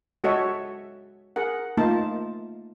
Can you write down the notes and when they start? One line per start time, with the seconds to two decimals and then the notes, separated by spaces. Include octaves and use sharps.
0.24 G#3 F#4 A4 C#5 D#5 E5
1.36 G#4 A#4 F#5
1.77 A3 A#3 D#4 F4 A5